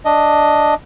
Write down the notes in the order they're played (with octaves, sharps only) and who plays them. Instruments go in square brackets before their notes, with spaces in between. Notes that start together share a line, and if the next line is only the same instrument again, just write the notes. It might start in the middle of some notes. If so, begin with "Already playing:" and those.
[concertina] D4 D#5